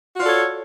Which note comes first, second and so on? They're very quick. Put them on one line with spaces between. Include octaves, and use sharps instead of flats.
F#4 F4 D5 A4 C#5